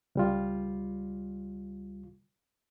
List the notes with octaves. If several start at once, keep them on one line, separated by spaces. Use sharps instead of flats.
C#2 G3 F4